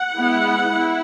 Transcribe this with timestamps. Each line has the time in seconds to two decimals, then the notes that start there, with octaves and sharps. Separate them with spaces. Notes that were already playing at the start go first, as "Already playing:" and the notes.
Already playing: F#5
0.16 G#3 B3 E4
0.72 E4